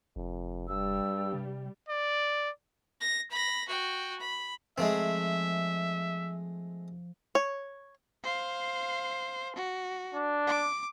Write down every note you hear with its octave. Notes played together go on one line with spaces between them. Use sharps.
F1 F2
G2 G3 E6
C3
D5
A#6
B5 A#6
F#4 G5
B5
F3 G#3 A3 C4 E5
C#5
C5 F5
F#4
D4
D6